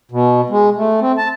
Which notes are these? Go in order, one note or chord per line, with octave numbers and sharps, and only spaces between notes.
B2
G#3
A3
C4
A5